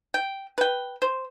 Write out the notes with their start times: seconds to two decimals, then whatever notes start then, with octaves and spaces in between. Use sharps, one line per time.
0.14 G5
0.58 B4 G5
1.02 C5